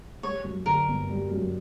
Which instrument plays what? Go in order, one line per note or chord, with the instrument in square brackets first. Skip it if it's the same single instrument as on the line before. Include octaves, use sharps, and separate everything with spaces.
[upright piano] G3 [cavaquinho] C#5
[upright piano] F#2
[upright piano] D3 [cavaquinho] A#4
[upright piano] G1
G3
F#2